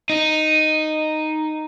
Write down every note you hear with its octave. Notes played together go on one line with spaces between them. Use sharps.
D#4